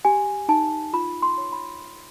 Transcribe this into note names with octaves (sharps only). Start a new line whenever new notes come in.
G4 G#5
D#4 A5
F4 B5
C6
C#5
B5